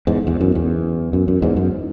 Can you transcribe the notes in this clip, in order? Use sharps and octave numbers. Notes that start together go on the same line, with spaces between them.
E2 G#2
E2
F#2
E2
F#2
F#2
E2 G#2
F#2